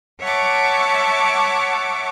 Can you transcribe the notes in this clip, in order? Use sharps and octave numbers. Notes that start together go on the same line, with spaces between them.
C#5 E5 F#5 A5 C#6 D6